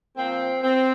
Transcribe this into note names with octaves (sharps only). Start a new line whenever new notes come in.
A#2 F3 A#3 C4
C4